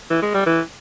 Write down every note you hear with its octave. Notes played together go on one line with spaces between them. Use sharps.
E3
G#3
G3
E3